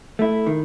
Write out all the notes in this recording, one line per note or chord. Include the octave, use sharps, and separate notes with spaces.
A3 E4
D#3